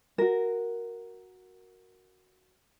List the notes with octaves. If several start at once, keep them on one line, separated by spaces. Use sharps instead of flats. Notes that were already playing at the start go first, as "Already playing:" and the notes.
F#4 A#4